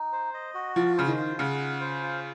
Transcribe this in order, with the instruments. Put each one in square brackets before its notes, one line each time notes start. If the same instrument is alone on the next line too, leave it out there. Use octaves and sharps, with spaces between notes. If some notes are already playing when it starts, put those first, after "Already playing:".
Already playing: [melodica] D#4
C5
D#5
F#4
[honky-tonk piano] F3 [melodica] F4
[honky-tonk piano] C#3 [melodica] C5
[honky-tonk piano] D#3
[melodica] F4
[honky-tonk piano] C#3 [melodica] F#5
[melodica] F4
C5
F4